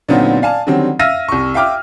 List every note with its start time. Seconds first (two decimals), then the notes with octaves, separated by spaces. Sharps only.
0.09 A#2 D3 F#3 B3 C4 D#4
0.42 D5 F5 G#5 A5
0.67 D3 D#3 F#3 G3 C4
0.99 E5 F5 E6 F6 A#6 D#7
1.28 C2 C#6
1.54 E5 F5 G5 D6 F6